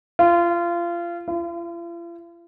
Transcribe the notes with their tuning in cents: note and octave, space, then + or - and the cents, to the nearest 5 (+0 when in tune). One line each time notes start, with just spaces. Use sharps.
F4 -25
F4 -45